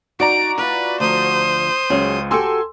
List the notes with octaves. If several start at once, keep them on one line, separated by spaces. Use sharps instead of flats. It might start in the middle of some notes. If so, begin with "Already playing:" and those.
D#4 F#4 D5 A#5 D7
E4 F4 B4
D2 F3 C5 D#6
C#2 F#3 C#4 G#4
F#4 G4 A4 G#5 C6 E6